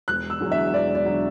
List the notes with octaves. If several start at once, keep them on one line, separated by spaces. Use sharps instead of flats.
E1 F#6
E6
E2 D3 F#3
E5
E1 D5
D5
D3 F#3